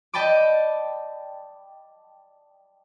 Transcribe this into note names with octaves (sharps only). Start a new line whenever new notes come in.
D5 D#5 G5 A5 B5 D6